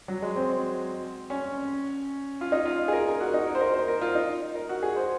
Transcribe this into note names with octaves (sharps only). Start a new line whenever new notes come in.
F#3
G#3
C4
C#4
F4
D#4
F4
G#4
A#4
A#4
F#4
D#4
A#4
C5
A#4
C5
A#4
F4
D#4
A#4
F#4
G#4
C5